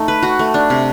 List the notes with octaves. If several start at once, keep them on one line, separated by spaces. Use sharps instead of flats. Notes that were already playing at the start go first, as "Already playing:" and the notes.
Already playing: A3 D#4
B4
F#4
A3
D4
C3